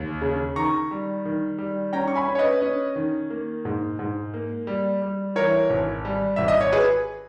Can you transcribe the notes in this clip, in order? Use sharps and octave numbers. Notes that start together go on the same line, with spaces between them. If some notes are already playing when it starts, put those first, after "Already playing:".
Already playing: D#2
C#3
D#3 A#5 C#6
G3
D#3
G3
C#4 G5 A#5
C#6
G#5 B5
C#4
C#5
B4 D#5
C#4
D#3
A#3
G#2
G#2
A#3
G3
G3
E3 A#4 C#5
G#1
G3
G#1 E5
D#5
C#5
G#4 B4